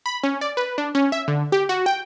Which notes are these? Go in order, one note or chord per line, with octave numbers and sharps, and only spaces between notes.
B5
C#4
D5
B4
D4
C#4
E5
D3
G4
F#4
G5